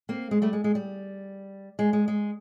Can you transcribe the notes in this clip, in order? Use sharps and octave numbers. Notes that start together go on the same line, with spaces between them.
A#3 C4
G#3
G3 A3
G#3
G#3
G3
G#3
G#3
G#3